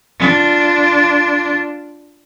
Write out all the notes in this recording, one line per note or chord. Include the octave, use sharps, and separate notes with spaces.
D4 F4